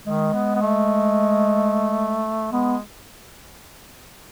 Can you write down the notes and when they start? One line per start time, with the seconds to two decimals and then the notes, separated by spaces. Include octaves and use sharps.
0.07 D#3 G#3
0.34 B3
0.56 B3
0.61 A3
2.52 G#3 B3